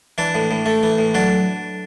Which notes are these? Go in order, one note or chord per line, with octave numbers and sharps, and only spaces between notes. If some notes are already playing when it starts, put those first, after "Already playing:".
E3 D4
A2
A2
A3
E3
A2
F#3 D4